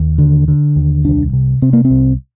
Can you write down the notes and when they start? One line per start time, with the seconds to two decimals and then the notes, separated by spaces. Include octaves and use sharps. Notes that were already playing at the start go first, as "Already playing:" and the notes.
Already playing: D#2
0.18 D3
0.48 D3
0.76 D#2
1.05 C2 D4
1.33 C3
1.62 C3 C4
1.73 A#3
1.85 C4
1.91 C2